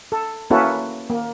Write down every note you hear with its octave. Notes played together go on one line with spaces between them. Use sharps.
A4
A#3 C#4 E4 F#4 A4 B4
A#3